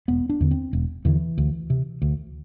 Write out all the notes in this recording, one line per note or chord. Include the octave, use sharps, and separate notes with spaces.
E1 B3
D4
E2 D3
C4
E1
E2 D3 E3
D2
C3
D2